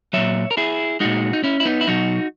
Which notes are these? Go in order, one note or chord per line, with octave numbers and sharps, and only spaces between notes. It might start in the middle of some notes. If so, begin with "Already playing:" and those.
A#2 F#3 C#5 E5
A#4
E4 G#4
A#2 G#3 D#4 F#4
D#4
C#4 E4
E4
B3 D#4
E4
B2 F#3 D#4 F#4